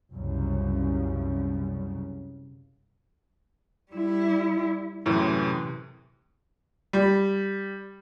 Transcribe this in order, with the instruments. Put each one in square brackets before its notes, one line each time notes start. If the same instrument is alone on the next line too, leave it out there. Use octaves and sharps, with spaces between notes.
[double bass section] C2 F#2 C#3
[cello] G3 E4
[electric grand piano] F#2 A2 E3 [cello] C3
[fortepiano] G3